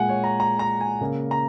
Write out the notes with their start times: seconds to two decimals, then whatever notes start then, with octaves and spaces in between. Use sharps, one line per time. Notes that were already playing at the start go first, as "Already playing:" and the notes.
Already playing: A#2 G#3 F#5 G#5
0.09 C#5
0.24 A#5
0.40 A#5
0.59 A#5
0.81 G#5
1.01 C#3 A#3
1.31 A#5